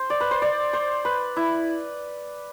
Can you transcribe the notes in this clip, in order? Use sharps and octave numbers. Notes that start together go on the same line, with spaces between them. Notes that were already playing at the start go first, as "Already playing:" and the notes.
Already playing: C5
D5
B4
C5
D5
C5
B4
E4